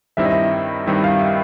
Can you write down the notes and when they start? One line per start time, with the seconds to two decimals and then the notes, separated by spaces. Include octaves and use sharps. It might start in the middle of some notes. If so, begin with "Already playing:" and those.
0.17 G2 D#3 G3 C4 E4 E5
0.25 D#5
0.32 E5
0.86 G2 D#3 G3 C4 E4
1.04 F5
1.21 E5